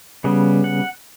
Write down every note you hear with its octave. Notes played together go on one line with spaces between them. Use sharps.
C#3 G3 B3
F#5